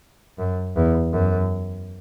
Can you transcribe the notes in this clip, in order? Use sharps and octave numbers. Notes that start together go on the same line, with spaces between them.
F#2
E2
F#2